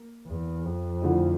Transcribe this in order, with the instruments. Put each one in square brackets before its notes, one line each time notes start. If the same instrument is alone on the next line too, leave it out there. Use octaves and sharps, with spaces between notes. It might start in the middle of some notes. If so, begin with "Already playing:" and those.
Already playing: [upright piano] A#3
[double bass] E2
F2
[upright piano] D3 F3 A3 E4